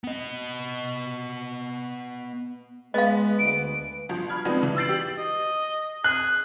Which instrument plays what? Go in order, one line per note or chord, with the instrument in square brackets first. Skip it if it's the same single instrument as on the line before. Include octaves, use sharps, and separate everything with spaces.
[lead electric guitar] B3 D#5
[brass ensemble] G#3 [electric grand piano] B3 B4 [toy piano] D#5 F5
[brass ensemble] D2 [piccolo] D7
[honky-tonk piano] G1 F3
B5 F6 G#6
F3 G#3 B3 C4 D4 D#4
E3
E6 G6 A6 C7 D7 F#7
G4 F#7
[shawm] D#5
[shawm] G#4 [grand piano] F#6